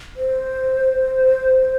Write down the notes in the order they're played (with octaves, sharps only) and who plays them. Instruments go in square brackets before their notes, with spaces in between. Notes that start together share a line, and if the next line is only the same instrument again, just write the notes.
[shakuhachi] C5